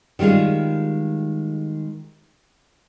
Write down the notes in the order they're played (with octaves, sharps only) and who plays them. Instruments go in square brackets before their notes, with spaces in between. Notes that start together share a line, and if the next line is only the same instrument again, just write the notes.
[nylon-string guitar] D#3 G3 G#3 F4 G#4